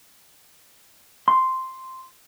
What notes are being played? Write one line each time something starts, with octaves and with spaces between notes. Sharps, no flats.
C6